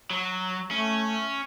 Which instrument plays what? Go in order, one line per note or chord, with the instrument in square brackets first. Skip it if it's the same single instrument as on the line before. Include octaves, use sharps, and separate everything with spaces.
[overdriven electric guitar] F#3
[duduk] A3 [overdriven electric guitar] C#4